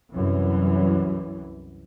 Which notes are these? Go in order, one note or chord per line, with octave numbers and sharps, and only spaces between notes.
C2 F#2 E3